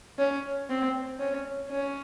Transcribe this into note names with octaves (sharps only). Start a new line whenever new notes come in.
C#4
C4
C#4
C#4